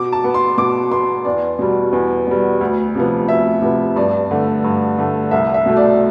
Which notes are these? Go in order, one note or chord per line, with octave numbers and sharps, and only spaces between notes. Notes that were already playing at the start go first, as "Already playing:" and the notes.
Already playing: B2 D6
A5
B3
C6
B2 D6
B3 C6
E2 D5
B2 G3
E2
B2 G3
D2
C3 F3 B3
D2 E5
C3 F3 B3
G2 D5
D3 A3
G2
D3 A3
C2 E5
E5
B2 A3
D5